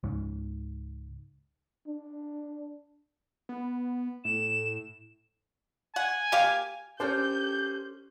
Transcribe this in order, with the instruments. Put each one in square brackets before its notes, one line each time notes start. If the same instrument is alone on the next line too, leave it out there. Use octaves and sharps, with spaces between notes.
[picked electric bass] C#2 G#2
[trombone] D4
[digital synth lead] B3
[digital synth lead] A2 [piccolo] E7
[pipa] F#5 [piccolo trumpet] G#5
[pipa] A#3 G4 F5
[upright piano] C#4 C5 [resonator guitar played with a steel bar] D4 A4 A#4 [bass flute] G4 [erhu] G6